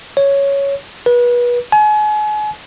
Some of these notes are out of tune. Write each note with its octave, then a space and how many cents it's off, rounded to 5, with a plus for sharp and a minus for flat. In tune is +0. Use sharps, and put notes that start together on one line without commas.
C#5 +5
B4 -30
G#5 +35